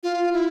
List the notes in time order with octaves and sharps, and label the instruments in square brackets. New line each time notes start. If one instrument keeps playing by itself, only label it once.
[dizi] F4
E4